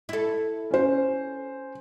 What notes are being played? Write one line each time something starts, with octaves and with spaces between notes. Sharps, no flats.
E4 A4
C#4 C5